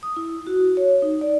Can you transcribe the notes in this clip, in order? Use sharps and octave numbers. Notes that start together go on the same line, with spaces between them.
D#6
E4
F#4
C#5
D#4
D5